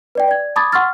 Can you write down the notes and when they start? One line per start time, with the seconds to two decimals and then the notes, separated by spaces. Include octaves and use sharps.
0.15 B4 D5 G5
0.28 D5 G#6
0.56 A5 B5 D6 D#6 G#6 A6
0.72 F#5 C6 C#6 E6 F6 A6